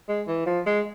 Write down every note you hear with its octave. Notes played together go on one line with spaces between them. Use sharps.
G#3
E3
F3
G#3